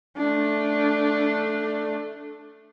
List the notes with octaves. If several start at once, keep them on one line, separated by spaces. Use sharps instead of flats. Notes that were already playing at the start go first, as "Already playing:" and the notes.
A3 D4